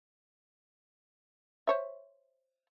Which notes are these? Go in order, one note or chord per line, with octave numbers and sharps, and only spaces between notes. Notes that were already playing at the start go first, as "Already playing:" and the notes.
C5 C#5 E5